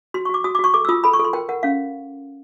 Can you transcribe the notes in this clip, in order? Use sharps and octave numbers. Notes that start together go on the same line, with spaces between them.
F#4 C6
C#6
F#4 D6
F#4 D#6
D6
F#4 C#6
A4 D6
E6
F4 D#6
A4 B5
C#6
A4
C6
A#4 G5
A#4 F#5
C#4 F5